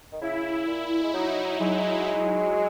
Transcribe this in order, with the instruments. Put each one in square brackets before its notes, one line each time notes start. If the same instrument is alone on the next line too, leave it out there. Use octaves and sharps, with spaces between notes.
[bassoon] D#3
[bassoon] C#3 [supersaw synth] E4
[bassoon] A#2
G#3
[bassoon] F#3 [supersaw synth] D#4
[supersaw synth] F#3 [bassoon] G#3
[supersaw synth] F#3